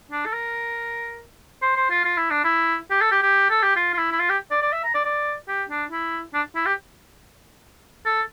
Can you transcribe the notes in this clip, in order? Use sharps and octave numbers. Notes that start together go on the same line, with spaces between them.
D4
A4
A#4
C5
C5
F4
F4
E4
D4
E4
G4
A4
G4
G4
A4
G4
F4
F4
E4
E4
F4
G4
D5
D5
E5
A#5
D5
D5
G4
D4
E4
D4
E4
G4
A4